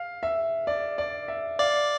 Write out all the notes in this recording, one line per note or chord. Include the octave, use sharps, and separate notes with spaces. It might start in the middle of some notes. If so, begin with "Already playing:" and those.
Already playing: F5
E5
D5
D5
E5
D5 F5